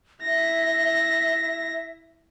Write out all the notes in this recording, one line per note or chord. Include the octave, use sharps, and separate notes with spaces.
E4 E5 A#6